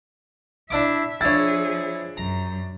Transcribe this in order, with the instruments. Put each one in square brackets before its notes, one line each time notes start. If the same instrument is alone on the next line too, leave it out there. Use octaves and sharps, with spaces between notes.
[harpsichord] D4 E4 D6 [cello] E5
[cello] F3 G#4 [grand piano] D4 A6 [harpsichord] E4 C#5
[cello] F#2 [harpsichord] A#5